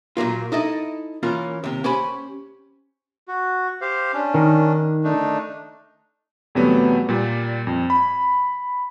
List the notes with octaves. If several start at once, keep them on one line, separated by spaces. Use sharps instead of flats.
A#2 F#3 A#3 F4
D#4 E4 A4 D#5
E3 A#3 C#4 F4
D#2 C3
C#4 G4 C5 G#5 B5
F#4
G4 C5 F5
C#4 D4
D#3
A3 D4 D#4
E2 C3 F#3 G3 A3 B3
A#2 G3
F2
B5